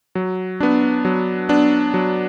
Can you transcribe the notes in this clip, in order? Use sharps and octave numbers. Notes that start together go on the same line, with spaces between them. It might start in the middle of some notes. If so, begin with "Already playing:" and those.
F#3
B3 D4
F#3
B3 D4
F#3